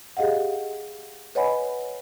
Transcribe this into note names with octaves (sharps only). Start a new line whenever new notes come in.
G4 G#4 D#5 F5 F#5
B4 C#5 D#5 F#5 G#5 B5